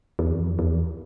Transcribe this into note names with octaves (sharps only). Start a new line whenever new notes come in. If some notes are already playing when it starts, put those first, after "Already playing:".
E2
F2
E2